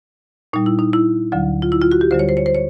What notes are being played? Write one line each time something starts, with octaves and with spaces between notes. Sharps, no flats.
A#2 G3 D#4
E4
D#4
E4
D2 D3 F#3
F4
E4
F4
F#4
G4
D2 D3 G3 C5
C#5
C5
C#5
C5
C#5